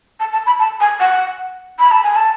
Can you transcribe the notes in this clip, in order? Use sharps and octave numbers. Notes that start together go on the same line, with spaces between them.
A5
A5
B5
A5
G#5
F#5
B5
A5
G#5
A5